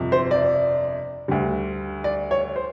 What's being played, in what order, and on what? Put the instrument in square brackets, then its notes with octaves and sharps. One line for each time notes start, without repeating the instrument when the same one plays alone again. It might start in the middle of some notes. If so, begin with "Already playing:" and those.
Already playing: [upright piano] G1 F2 C3
C5
D5
D2 D3 G3
D5
C#5
C5